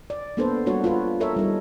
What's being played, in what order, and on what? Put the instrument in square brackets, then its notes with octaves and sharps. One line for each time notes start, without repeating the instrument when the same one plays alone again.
[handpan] D5
A#3 B3 D4 A4 B4 C5
G3 A#3 D4 F#4 C#5
F4 F#4 B4
A4 A#4 C#5 E5
G3 D#4